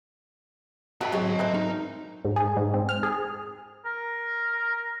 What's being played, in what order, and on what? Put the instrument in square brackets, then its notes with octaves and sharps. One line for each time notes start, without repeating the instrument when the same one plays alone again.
[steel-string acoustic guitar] A2 [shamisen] F#4 E5 B5 [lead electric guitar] D#5 A5
[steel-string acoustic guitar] G#2 F#3 C4 [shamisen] C#3 G#3 C#5
[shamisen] A3 B4 C5
[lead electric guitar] D#4 [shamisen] A#4
[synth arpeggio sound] G#2
G#4
G#2
C4
F6
G#4
[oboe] A#4